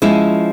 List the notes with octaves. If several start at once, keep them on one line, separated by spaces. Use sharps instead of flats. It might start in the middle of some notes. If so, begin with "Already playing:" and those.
F3 G#3 C#4 E4